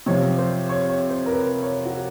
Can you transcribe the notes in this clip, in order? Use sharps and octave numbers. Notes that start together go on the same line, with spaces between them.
C3 F3 C#5
C5
C#5
C#5
C5
A#4
B4
C#5
F#4
G4